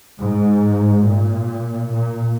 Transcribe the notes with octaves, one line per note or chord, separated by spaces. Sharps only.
G#2
A#2
A#2